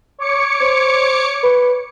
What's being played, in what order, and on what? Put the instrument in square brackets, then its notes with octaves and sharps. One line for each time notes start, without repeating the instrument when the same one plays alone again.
[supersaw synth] C#5 D6 C#7
[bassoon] C5
B4